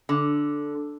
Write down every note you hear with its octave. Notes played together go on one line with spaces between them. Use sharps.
D3